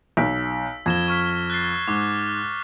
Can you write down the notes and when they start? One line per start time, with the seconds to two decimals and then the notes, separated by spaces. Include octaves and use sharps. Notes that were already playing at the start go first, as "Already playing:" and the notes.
0.17 B1 E6 B6 D7
0.86 F2 G#6 E7 G7
1.08 C#6 F6 B6
1.50 F#6 A6 C7
1.88 G#2 D6